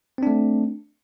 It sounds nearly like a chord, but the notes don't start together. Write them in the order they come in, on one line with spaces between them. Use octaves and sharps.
C4 D4 A3